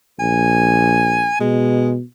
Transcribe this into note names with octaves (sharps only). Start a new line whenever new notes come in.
A#1 G#5
B2 G#3